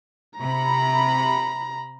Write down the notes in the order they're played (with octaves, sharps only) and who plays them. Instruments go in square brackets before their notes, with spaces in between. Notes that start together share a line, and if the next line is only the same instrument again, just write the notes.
[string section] C3 B5 [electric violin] A#5